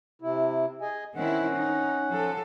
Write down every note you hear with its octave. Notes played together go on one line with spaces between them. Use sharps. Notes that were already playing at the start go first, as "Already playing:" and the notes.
C3 E4
G#4 D#5 G#5
D#3 C4 C#4 E4 F#5
D#4
F3 A4